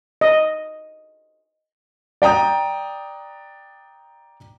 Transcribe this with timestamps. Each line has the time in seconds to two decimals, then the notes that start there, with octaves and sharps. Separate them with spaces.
0.21 D#5
2.22 D5 G5 A#5 D#6 G6